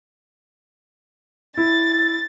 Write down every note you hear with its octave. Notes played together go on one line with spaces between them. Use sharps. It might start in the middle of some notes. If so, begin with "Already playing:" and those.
E4 A6